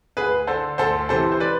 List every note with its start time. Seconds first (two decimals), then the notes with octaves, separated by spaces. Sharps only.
0.17 D2 G#4 B4
0.47 D3 A4 C5
0.78 D2 A4 C5
1.09 C3 E3 A4 C5
1.32 C5
1.40 B4 D5